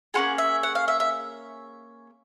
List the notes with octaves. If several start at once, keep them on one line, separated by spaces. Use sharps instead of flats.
A#3 C#4 F4 G#4 F#5
E5
F#5
F5
E5
E5